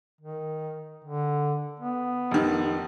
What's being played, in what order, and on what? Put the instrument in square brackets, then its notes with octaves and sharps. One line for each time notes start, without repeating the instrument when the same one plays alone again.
[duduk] D#3
D3
B3
[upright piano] F1 D#3